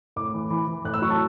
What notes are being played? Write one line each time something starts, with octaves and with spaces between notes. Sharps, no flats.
A2 D6
E3
E3
E3
A2 F#6
E6
F#3 C#6
A5